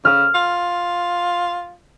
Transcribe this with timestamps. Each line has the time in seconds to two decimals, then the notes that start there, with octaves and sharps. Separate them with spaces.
0.05 C#3 F6
0.34 F4